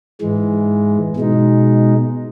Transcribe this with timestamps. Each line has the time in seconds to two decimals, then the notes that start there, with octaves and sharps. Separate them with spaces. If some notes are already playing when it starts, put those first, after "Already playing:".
0.21 G#2 E3 G#3
1.17 B2 G#3 D#4